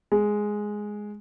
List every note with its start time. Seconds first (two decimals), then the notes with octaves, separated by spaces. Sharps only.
0.12 G#3